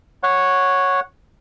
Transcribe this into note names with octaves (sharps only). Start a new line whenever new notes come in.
C#5 F#5